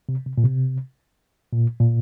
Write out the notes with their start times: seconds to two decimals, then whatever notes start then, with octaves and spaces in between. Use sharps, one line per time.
0.09 C3
0.26 C3
0.38 A#2
0.44 C3
1.53 A#2
1.80 A#2